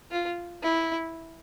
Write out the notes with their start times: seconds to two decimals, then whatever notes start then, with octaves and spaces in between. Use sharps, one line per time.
0.11 F4
0.62 E4